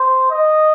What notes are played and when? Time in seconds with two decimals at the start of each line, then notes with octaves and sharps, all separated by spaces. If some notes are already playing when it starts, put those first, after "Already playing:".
Already playing: C5
0.31 D#5